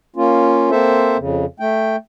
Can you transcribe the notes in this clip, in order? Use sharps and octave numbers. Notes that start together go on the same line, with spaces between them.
A#3 C#4 F4
A#3 C4 A4 C5 E5
F2 C#3
A3 G5